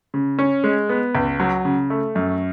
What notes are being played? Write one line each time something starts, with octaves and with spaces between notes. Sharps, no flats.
C#3
C#4
G#3
B3
C#2
F#3
C#3
A3
F#2